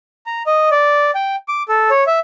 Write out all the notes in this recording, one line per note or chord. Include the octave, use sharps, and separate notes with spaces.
A#5
D#5
D5
G5
D6
A4
C#5
E5